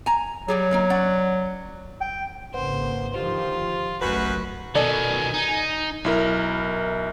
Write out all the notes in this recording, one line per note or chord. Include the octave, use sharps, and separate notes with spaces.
G#5 A#5
F#3 G3 G4 G#4
D3 A#3 D#4
C#4 D5 F#5
G5
G#1 C#3 A#3 B4 C5 F#5
D3 D#3 F3 F4 G4 C5
F#1 B1 F#2 A3 F#4 B4 B5
B2 D#3 A4 D5 D#5 G#5
D#4
B1 E4 A#4